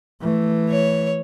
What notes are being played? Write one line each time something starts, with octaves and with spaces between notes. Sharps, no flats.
E3 A3
C#5